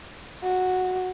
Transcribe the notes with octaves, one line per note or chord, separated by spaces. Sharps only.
F#4